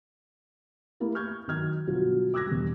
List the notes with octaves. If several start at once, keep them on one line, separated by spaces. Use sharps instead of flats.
A3 A#3 E4 G4 A#4
C#6 F6 G6 G#6
D#3 F#3 F6 G#6
G1 B2 F#3 F4 F#4
D6 E6 F#6 G#6 A#6
E1 G3